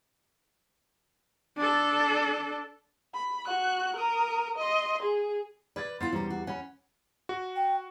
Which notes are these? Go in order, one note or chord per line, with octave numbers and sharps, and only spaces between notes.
D4 A4
B5
F#4 F#6
A#4 D#6
D#5 C6
G#4
B4 D5 G#6 A6
B3 E4 F4 C6 A6 C7
E2 G3 C#4 C5 A#5
F#4
C#4 F#5 B5
F#4
G5